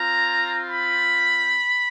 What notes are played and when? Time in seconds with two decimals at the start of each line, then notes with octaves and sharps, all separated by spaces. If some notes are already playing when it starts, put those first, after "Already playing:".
Already playing: C4 F4 A#5
0.70 B5